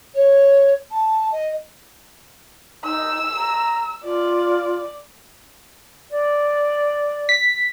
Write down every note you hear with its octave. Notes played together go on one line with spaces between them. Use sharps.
C#5
A5
D#5
D#4 E6
A#5
F4 D5
D5
B6